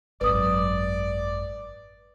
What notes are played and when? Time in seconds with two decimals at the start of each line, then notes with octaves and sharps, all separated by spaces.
0.21 G#1 F#2 B4 D5 D#6